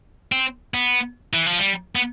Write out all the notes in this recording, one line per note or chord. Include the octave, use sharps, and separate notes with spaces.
C4
B3
E3
F3
G3
B3